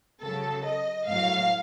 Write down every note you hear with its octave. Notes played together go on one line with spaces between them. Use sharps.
C#3 F#3 A4
D#5
A2 F#3 F5